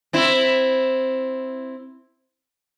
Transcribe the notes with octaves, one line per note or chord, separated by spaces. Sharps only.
C4 E4